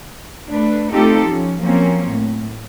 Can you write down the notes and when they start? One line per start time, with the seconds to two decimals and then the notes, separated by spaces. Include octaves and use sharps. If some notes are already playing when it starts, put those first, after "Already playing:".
0.48 A3 D4 B4
0.91 A3 C4 D#4 F4 G4 A4
1.27 F3 C#4
1.59 F3 F#3 A#3 C4 C#4
2.09 A2